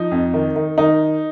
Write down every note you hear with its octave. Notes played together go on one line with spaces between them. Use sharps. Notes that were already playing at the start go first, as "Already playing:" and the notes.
Already playing: F3 D#4
F2
D#3
D#3
D#3 D#4